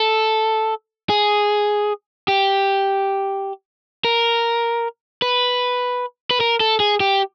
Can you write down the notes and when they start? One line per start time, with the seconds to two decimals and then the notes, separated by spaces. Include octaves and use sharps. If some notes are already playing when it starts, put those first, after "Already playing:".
Already playing: A4
1.09 G#4
2.28 G4
4.05 A#4
5.22 B4
6.31 B4
6.40 A#4
6.60 A4
6.80 G#4
7.00 G4